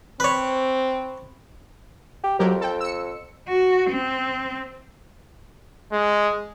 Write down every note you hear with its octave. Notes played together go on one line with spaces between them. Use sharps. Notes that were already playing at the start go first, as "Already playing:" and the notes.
C4 B4 C#5
G4
F2 F#3 G4 A#4
A4 G5
E6 C#7
F#4
C4
G#3